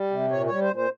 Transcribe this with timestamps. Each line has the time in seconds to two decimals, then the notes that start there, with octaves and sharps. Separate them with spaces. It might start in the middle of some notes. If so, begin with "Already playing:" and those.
Already playing: G3
0.11 C3
0.31 A#2 C#5
0.46 G3 C#5
0.61 C5
0.70 A#2
0.76 C5